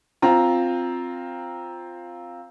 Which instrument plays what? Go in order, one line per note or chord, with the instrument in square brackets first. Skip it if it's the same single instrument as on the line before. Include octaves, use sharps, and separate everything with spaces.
[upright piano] C4 F4 A#5